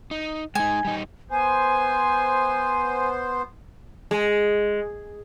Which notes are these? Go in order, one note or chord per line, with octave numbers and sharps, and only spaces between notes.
D#4
G#3 D#4 G#5
G3 D#4
B3 C5 G#5
G#3